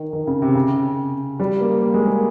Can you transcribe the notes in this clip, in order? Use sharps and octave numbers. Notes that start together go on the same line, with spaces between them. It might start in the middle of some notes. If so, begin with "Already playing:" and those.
Already playing: D#3
D#3
C#3
C3
C#3
G3
A#3
A#3
G#3
A#3